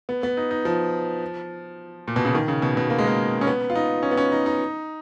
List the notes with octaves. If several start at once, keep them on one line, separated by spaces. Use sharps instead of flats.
B3
B3
D#4
D#4
F3
A#2
B2
C#3
D#3
C#3
B2
B2
A#3
G#3
A#3
C#4
B3
F4
D#4
C#4
B3
C#4
D#4
D#4